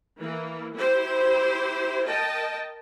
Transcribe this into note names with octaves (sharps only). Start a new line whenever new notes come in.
E3 A#3
E4 G4 C5
A#4 D#5 G5 A5